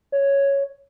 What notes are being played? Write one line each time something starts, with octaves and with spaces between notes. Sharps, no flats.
C#5